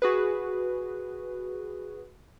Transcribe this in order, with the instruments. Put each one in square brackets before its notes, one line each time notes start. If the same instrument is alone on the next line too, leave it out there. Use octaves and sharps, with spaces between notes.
[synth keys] F#4 G#4 B4